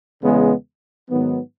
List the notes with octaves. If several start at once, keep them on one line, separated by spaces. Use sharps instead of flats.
E2 C#3 G#3 B3
G#2 D#3 F#3 B3